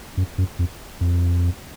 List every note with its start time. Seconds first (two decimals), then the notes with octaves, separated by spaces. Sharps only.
0.17 F#2
0.38 F#2
0.59 F2
1.01 F2